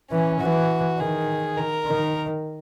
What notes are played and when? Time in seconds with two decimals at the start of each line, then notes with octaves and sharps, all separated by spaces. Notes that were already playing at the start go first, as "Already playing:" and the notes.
0.11 E3 C#4
0.40 E3 F#4
0.99 D#3 G#4
1.58 A#4
1.86 D#3